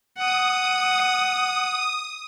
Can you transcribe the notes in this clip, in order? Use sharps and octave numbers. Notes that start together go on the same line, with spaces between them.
F#5 D#6